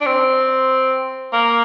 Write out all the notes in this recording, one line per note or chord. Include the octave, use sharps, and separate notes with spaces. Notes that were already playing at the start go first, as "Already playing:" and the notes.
D4
C4
A#3